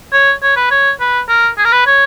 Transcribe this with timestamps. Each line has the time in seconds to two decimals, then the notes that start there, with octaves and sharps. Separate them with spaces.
0.12 C#5
0.42 C#5
0.56 B4
0.71 C#5
1.00 B4
1.28 A#4
1.58 G#4
1.65 A#4
1.72 B4
1.87 C#5